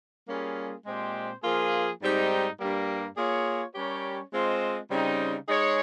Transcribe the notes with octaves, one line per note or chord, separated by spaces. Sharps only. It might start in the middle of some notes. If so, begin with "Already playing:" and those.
G3 A#3 C#4 F4 G#4
A#2 G#3 C4 G4 C5
F3 A#3 F4 G#4
G#2 G3 C4 D#4 G4
G2 G3 A#3
A#3 F4 G#4 C#5
G3 C#4 G4 A#4 C#5
G#3 C4 F4 C5 D#5
C#3 G3 C4 D#4
G#3 D#4 G#4 C#5